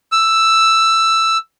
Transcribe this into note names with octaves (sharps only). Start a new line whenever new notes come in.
E6